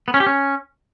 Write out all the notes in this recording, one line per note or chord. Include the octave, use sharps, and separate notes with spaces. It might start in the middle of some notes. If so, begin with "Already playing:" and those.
B3
C#4
G4
C#4